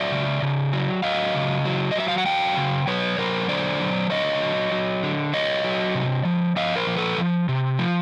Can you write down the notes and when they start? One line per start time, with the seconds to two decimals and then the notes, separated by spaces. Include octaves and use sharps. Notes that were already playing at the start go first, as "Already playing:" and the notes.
Already playing: F#3 D5 E5
0.11 C#3
0.42 C#3
0.73 F#3
1.03 F#3 D#5 F5
1.35 C#3
1.65 F#3
1.92 D#5
1.96 F#3 E5
2.08 F5
2.18 F#5
2.26 F#3 F5 G5
2.57 C#3
2.87 F#3 B4 C#5
3.18 F#3 A#4 C5
3.48 D3 C5 D5
3.80 F#3
4.10 D3 C#5 D#5
4.41 F#3
4.72 F#3
5.03 D3
5.33 F#3 C#5 D#5
5.64 F#3
5.95 C3
6.25 F3
6.56 F3 D#5 F5
6.76 A#4 C5
6.87 F3
6.97 A4 B4
7.17 F3
7.49 C3
7.79 F3